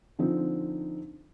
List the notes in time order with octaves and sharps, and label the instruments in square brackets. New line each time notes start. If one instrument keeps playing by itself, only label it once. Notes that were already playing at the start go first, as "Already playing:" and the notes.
[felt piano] D3 F3 C4 D#4